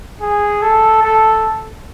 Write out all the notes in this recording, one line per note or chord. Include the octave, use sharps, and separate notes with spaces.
G#4
A4
A4